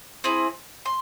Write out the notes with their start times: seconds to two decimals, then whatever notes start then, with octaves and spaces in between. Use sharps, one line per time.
0.24 C4 E4 G#4
0.86 C6